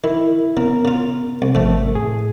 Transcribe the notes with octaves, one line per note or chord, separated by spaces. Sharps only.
D#3 E4
C#3 B3 A#4
C#3 F4
C2
G#1 F2 C#3 A3
A2 G#4